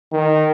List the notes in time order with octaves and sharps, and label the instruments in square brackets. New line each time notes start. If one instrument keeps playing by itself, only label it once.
[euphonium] D#3